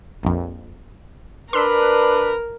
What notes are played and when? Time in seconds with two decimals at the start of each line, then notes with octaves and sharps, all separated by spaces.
0.23 A#1 F2
1.53 D4 A#4 B4 C6 E6 B6